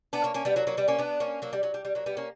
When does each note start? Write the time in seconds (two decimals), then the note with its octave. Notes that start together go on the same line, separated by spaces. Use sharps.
0.13 B3 D4
0.24 A#3 C#4
0.34 A#3 C#4
0.45 G3 B3
0.56 F#3 A#3
0.67 F#3 A#3
0.77 G3 B3
0.88 A#3 C#4
0.98 B3 D4
1.20 A#3 C#4
1.42 F#3 A#3
1.53 G3
1.63 F#3
1.74 G3
1.85 G3
1.95 F#3 A#3
2.06 G3 B3
2.17 A#3 C#4